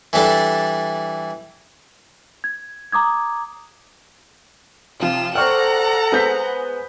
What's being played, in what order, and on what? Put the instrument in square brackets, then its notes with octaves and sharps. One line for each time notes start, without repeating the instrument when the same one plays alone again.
[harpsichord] E3 G3 D4 A4 D5
[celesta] G#6
A#5 D6 D#6 G#6
[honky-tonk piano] C3 F3 [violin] F4 E7
[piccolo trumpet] A4 [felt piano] C5 C#6 F6 [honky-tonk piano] D5 G5 [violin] F#5 A#5
[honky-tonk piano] G#3 B3 G#5 [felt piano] C5 G6 B6